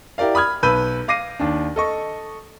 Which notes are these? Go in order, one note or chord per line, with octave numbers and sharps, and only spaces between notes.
E4 G4 A#4 D5 F5
B5 D#6 F6 G#6
B1 B4 B5 E6 G6 D#7
F5 D6 A#6 C7 D#7
D#2 D4
A4 D#5 C#6